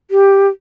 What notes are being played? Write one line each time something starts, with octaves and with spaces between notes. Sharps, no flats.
G4